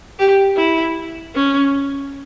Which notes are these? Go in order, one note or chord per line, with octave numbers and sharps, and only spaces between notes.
G4
E4
C#4